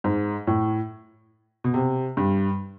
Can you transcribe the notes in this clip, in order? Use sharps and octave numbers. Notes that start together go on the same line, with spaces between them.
G#2
A2
B2
C3
G2